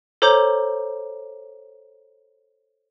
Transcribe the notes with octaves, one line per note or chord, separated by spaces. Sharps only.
A4 C5 C#5 A#5 D6 G6